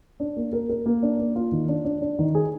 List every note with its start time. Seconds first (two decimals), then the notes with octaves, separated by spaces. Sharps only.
0.20 D4
0.36 A#3
0.53 A#4
0.69 A#4
0.86 A#3
1.03 D4
1.19 A#3
1.36 F4
1.52 D#3
1.68 D4
1.85 D4
2.01 D4
2.19 D#3
2.35 G#4